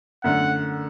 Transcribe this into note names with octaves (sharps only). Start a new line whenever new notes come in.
F#2 D3 A3 F#5